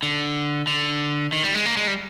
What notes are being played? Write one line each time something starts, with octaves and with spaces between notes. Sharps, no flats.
D3
D3
D#3
G3
G#3
A#3
G#3
G3